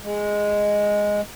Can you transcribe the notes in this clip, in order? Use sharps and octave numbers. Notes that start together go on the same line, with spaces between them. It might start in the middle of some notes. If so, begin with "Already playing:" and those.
G#3